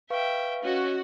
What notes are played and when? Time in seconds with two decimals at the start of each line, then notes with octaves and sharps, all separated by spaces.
0.10 B4 E5 F5 G5 C#6
0.63 C#4 F#4 D#5